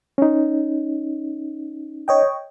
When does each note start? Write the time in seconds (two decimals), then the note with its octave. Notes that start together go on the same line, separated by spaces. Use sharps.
0.18 C#4 D#4
2.08 C#5 D#5 G5